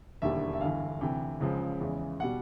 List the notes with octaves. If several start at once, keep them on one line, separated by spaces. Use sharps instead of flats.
E1 D#2 D3 G3 E5
E5
G1 G2 E3 F5
D2 C3 E3 G5
C#2 C#3 F3 G#3
E2 C#3 E3 G#3
B2 G3 F#5